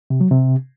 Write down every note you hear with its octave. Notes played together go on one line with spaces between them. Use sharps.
C3
F#3
C3